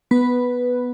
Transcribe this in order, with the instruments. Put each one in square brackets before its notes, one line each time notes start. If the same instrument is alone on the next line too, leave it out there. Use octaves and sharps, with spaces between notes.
[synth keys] B3 B4